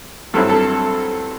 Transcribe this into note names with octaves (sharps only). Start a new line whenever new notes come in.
G2 F#3 C4 E4 A4
A4